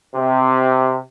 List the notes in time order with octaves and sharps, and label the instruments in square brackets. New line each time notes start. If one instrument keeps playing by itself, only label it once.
[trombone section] C3